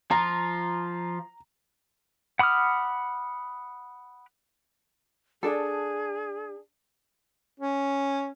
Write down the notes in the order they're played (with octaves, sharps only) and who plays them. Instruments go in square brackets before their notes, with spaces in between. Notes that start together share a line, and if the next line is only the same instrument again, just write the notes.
[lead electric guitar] F3 F4 [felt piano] A#5
[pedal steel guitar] F#5 B5 D6 D#6 F6
[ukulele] D4 A4 [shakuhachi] G#4
[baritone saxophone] C#4